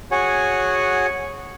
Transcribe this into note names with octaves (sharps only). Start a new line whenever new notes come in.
F#4 G#4 C#5 F#5 G#5